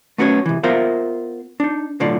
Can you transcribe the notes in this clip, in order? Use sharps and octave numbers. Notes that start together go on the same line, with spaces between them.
A3 B3 C#4 F#4 C5 C#5
C3 E3
B3 F4 A#4 C5 E5 F5
D4 D#4
B1 A2 D3 F4 D5